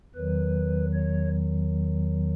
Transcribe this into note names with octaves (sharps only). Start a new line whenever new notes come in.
E2 D#3 F#3 B4
C#5